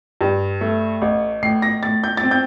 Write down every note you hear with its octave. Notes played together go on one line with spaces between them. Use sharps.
G2
A3
A1
A2 C7
A#6
A2 A6
G6
A6
C4
G6